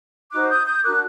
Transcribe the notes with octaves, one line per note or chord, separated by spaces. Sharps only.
D#4 F#4 C5 D6 F#6
D#6 G6
D#6 G6
D4 F#4 A#4 D6 F#6